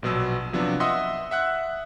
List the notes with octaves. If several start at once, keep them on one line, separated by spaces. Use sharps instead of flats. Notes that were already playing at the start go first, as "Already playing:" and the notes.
A#1 B2 F#3 E6
C3 F3 F#3 B3 D4
D#5 E5 F#5 C6 D#6 E6
E5 F#5 F#6